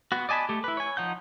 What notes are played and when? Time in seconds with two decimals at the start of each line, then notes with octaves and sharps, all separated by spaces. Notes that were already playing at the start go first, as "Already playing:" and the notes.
0.12 B3 F#4
0.29 D5 D#5 G#5 A5 B5
0.49 A3 G4
0.64 E4 B4
0.77 C#5 G#5
0.97 F3 D#4 F#5 G6